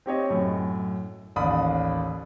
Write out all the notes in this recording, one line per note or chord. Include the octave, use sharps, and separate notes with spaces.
C4 G4 C#5 D#5
F#2 A2
A1 D#2 D5 B5 D#6